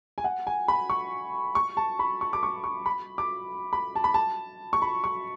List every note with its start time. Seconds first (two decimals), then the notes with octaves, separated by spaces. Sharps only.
0.18 G#5
0.24 F#5
0.47 G#5
0.68 B5
0.90 C#6
1.55 C#6
1.77 A5
1.99 B5
2.21 C#6
2.33 D6
2.43 C#6
2.64 C#6
2.86 B5
3.18 D6
3.73 B5
3.95 A5
4.04 B5
4.14 A5
4.73 C#6
4.82 B5
5.04 C#6